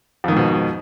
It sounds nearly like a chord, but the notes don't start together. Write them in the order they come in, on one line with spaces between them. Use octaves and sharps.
F2 D#3 G#2 B2